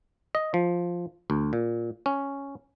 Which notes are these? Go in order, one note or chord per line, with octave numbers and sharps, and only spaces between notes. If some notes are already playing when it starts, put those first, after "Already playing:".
D#5
F3
D2
A#2
C#4